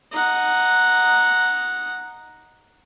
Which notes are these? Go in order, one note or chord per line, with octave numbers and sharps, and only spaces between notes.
D#4 F#5